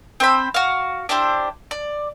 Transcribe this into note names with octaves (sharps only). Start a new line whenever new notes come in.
C4 C5 B5
F#4 F5
D4 E4 G4 C5
D5